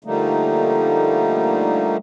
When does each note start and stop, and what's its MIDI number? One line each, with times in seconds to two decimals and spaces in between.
0.04 1.97 50
0.04 1.97 53
0.04 1.97 55
0.04 1.97 57
0.04 1.97 58
0.04 1.97 63